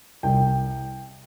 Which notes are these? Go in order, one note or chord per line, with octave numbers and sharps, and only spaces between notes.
C2 G5